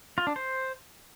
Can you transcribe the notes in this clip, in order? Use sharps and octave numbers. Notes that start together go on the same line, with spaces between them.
F4
D4
C5